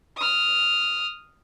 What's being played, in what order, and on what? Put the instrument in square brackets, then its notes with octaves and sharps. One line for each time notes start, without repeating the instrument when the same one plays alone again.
[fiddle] D#6 F6